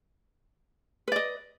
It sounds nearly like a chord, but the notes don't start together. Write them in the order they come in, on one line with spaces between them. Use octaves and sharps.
B4 D5 D#5